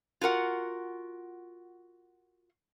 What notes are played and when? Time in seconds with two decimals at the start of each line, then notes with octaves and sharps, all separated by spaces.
0.21 F4 F#4 A#4 F#5